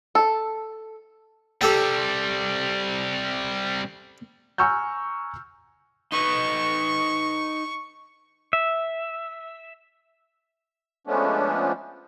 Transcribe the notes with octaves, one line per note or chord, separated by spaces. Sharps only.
A4
C3 G3 G4 A4 G5
G#5 A#5 C#6 E6 F6 G6
D#4 B4 D#5 C#6
E5
F3 G#3 A3 B3 C#4 D4